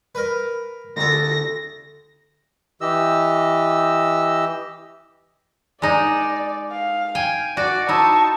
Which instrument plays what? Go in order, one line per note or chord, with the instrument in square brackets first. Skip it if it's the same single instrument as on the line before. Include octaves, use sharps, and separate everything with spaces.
[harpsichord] A#4 B4
[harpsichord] D2 A4 [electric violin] A#6
[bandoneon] E3 G4 D#5 E6
[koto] G#3 D#4 [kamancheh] D5
[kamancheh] F5
[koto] G5 G#5
[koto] F#4 [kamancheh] D5
[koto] D#4 E4 [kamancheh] A5 C#6